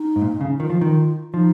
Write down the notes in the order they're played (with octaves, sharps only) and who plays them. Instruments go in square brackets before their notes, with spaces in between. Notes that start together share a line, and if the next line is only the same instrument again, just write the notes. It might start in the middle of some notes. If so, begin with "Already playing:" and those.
Already playing: [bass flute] D#4
[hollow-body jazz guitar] G#2
A#2
C#3
[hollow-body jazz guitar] D#3 [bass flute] F4
[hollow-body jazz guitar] F3
D#3
[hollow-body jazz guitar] F3 [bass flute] D#4